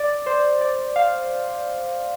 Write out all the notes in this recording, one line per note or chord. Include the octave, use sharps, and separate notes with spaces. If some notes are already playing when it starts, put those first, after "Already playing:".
Already playing: D5
C5
D5
F5